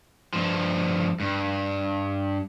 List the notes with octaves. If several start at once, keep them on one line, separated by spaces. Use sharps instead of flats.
G2 F3
G2